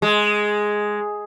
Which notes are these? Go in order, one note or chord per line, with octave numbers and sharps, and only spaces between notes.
G#3